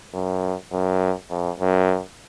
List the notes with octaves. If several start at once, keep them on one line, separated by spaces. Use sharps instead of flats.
F#2
F#2
F2
F#2